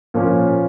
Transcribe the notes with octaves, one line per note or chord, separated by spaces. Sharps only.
A#2 F3 A#3 C#4